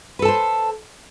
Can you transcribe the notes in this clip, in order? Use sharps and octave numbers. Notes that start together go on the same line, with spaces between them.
A4 B4 C5 A5